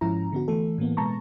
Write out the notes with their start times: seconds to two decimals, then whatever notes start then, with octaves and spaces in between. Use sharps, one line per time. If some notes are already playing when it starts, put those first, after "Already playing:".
0.01 G#2 F3 C#4 E4 A#5
0.32 D3 B3 F#4
0.48 E3 A3 A4
0.78 A2 E3 A#3 B3
0.97 B2 G#3 B3 A5 A#5 C#6